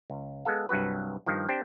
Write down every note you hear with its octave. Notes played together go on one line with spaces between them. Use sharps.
C#2
G#3 B3 A4 F5
C2 G2 F#3 F#4 B4
G2 D#3 F3
C4 D4 G4 C5